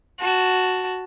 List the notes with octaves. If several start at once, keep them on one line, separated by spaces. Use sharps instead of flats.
F#4 A5